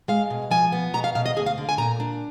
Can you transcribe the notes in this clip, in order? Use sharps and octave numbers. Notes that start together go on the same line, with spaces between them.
G#3 F5
B2
F3 G#5
B3
B2 A#5
F5
B2 F5
D#5
D2 G#4
F5
D3
G#5
A#2 A#5
D4